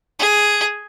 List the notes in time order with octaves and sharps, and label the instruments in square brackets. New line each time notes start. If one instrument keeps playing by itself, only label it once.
[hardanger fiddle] G#4